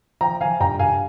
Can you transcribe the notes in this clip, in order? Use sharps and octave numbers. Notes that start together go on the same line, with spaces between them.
F3 G5 A#5
F3 F5 G#5
G2 G5 A#5
G2 F5 G#5